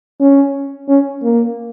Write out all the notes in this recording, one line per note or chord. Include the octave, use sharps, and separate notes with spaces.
C#4
C#4
A#3